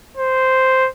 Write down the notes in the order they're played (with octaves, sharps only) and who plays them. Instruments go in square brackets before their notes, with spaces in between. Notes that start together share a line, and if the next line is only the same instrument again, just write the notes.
[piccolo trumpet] C5